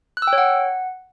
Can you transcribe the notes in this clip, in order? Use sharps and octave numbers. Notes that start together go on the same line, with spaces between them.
F#6
E6
G5
C#5
F#5